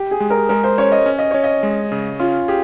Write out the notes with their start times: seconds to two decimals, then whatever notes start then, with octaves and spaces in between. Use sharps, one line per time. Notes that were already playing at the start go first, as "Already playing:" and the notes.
Already playing: G4
0.11 G#4
0.20 G#3
0.30 A#4
0.49 G#3 A#4
0.64 C5
0.78 C#4 C#5
0.92 D#5
1.06 C#4
1.19 D#5
1.31 C#4 C#5
1.44 D#5
1.63 G#3
1.92 C#3
2.19 C#4 F4
2.48 G4 G#4